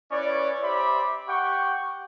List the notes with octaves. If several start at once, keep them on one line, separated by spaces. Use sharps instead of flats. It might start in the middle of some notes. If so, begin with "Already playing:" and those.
C#4 E4 B4 C#5 D5
G4 C5 D5 E5 B5 D6
G4 F#5 G5 C#6